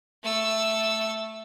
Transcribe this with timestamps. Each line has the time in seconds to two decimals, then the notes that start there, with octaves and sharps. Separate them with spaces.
0.23 A3 E6